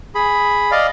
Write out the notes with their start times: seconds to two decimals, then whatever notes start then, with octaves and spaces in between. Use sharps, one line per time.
0.15 G#4 B5
0.71 D5 D#5 F5